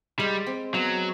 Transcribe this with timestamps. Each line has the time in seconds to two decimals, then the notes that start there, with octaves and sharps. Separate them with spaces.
0.19 G3 G#3
0.47 C4
0.74 F#3 B3